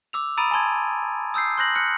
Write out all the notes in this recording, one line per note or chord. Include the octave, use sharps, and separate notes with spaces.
D6 E6 F7
A#5 B5 D#6 A6 D7 D#7
G#5 A5 C6 G#6
D#6 E6 G6 C7
C6 F#6 G6 A#6 F#7
F6 F#6 C#7